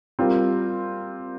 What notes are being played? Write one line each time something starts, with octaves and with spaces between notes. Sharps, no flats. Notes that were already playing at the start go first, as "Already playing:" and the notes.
G3 C4 F4 A#4